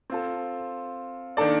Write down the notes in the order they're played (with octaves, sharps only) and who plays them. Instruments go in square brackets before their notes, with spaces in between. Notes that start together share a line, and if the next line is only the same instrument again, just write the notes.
[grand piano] C4 F4 A4
D#3 A#3 D4 A4 D5